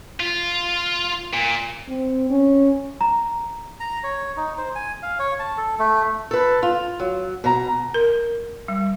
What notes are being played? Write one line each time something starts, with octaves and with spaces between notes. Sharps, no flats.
F4
A#2
C4
C#4
A#5
A#5
C#5
D#4
C5
G#5
F5
C#5
A5
A4
A3
A4 B4
F4
F#3
B2 A#5
A#4
G3